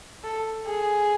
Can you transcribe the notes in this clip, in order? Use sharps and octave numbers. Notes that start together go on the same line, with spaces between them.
A4
G#4